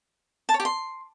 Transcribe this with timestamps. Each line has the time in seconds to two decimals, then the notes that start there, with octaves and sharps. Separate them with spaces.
0.49 A5
0.54 C#5
0.60 G4
0.65 C6